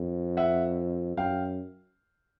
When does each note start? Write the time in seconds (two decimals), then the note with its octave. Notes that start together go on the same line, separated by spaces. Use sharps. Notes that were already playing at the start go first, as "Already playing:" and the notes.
Already playing: F2
0.37 E5 F#5
1.17 F#2 F5 G5